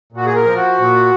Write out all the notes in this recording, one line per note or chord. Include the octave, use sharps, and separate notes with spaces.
A#2 F#4
G#4
A#4
F3
F#4
A#2